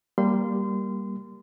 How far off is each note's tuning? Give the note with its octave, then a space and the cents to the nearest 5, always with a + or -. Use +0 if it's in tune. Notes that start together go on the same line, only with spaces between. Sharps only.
G3 +0 A#3 +5 C6 -25